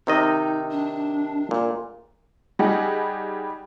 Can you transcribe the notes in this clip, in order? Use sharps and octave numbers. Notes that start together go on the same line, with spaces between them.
C3 D#3 D#4 D#5
D4
A#2
G3 D#4 G4 G#4 D#5 F#5